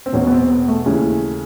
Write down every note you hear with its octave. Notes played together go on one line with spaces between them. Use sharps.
C4
E1 E2 B2 C#4
B3
C4
B3
A3
D#2 C#3 E3